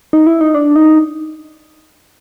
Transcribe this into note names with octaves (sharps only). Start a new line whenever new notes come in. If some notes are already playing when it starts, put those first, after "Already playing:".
D#4
E4
D#4
D4
D#4